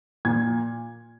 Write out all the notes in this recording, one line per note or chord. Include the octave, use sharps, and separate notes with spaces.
A#2 G#6